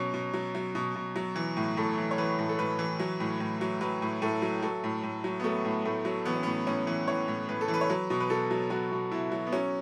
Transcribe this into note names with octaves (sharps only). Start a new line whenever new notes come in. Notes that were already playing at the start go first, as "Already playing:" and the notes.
Already playing: B2 F#3 C#4
B2
F#3
F#3
B2
B2
F#3
E3
A2
A2 A4
E3
C#5
E3 B4
A2
A4
A2 B4
E3
F#3
A2
A2
F#3
F#3 B4
A2
A2 A4
F#3
F#3 A4
A2
A2
F#3
B3
F#3 A3
A2
A2 A3
F#3
E3 B3
C#4
A2 B3
A2 C#4
E3
E3 C#5
A2
A2 B4
A4
E3
B4
C#5
F#3 B4
B2
B4
B2 A4
F#3
F#3 F#4
B2
B2 E4
F#3
B3
F#3 C#4